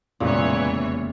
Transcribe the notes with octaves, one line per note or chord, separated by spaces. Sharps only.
F1 E2 A#2 C#3 E3 G#3 F4 C#5